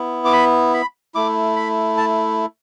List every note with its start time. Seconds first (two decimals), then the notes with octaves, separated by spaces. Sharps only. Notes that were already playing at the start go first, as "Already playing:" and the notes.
Already playing: B3 E4
0.25 D6
0.33 B5
0.74 B5
1.15 A3 E4 D6
1.56 B5
1.97 A5